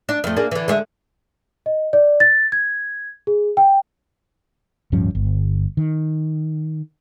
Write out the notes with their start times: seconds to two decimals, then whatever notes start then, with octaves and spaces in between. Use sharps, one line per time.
0.09 D4
0.24 F2 A3
0.36 A#3 D4 G#4
0.51 D3 E3
0.68 D3 G#3 E5
1.66 D#5
1.93 D5
2.20 A6
2.52 G#6
3.27 G#4
3.57 G5
4.92 D1 G2 F3 C#4
5.15 G1
5.77 D#3